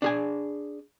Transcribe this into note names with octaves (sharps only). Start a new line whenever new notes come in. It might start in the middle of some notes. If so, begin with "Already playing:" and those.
D4 G#4 G#5